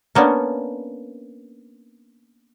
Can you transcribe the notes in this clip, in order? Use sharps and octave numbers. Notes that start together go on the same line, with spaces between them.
A#3 B3 C#4 D4